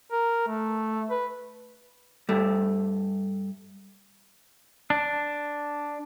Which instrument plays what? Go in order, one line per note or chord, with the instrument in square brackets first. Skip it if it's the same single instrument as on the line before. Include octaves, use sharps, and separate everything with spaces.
[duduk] A#4
A3
B4
[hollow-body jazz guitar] G2 A3
[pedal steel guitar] D4